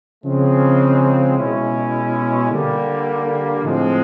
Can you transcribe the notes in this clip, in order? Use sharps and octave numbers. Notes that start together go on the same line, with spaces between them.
C#3 F3 G#3 C4
B2 G#3 C#4 E4
D3 G3 A#3
A2 F3 G#3 C4